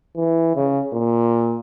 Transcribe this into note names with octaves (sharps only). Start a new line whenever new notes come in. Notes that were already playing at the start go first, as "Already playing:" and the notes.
E3
C#3
A#2